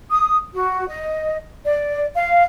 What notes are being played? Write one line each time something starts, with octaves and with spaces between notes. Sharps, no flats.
D#6
F#4
D#5
D5
F5